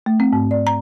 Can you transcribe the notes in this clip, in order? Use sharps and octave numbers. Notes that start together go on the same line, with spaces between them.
A3
C4
G#2
D5
A#5